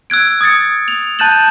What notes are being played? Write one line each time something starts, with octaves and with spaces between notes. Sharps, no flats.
E6 F#6 G#6 D7
D#6 G#6 A6 C#7
F7
A5 F#6 G6 A6 E7 F#7